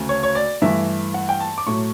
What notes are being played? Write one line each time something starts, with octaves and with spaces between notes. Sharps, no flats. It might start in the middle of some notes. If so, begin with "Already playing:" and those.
Already playing: D2 C#3 F#3 A3
C#5
C#5
D5
G2 E3 A3 E5
F#5
G5
A5
D6
A2 F#3 A3 C#6